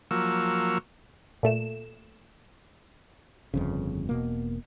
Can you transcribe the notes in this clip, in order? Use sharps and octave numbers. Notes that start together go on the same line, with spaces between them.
F3 F#3 A#3 C#6 E6
A#2 A3 E7
G1 F2 C#3
E1 B2 A#3